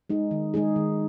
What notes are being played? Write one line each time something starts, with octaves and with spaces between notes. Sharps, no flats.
G#3 D#4 G#4
D#3
G#3 D#4 G#4
D#3